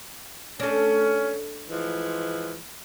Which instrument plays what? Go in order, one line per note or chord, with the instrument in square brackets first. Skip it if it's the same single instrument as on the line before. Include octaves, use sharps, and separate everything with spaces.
[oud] A3 D4 [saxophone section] C#4
[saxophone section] E3 F3 G#3